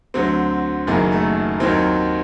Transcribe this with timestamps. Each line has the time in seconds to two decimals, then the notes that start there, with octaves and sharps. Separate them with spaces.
0.14 D2 D3 F#3 C4
0.87 F#1 F#2 D#3 F#3 A#3
1.12 A3
1.60 D#2 D#3 F#3 C4